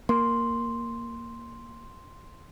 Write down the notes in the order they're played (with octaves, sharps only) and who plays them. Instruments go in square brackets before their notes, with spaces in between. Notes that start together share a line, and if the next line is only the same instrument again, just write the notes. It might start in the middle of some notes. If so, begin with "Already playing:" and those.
[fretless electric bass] A#3 [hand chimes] C6